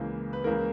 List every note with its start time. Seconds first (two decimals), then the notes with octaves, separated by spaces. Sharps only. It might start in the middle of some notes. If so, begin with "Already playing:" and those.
Already playing: C#2 C#3 E3 A#3
0.33 B4
0.44 C#2 C#3 E3 A#3 A#4